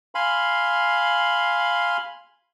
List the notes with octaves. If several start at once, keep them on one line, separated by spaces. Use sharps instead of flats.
F5 G#5 B5 C6